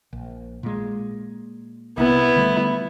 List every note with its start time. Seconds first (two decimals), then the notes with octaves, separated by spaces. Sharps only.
0.13 A#1
0.63 A#2 G#3
1.97 C2 C3 B3 E4
2.36 D3 G3 A3